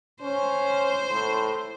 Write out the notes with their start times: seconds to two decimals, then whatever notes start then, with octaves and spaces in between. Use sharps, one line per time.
0.22 C#4 C5
1.10 A2